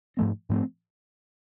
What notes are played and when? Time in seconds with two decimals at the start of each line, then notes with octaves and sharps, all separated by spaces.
0.17 G#2 F3 A3 C4
0.49 G#2 F3 A3 C4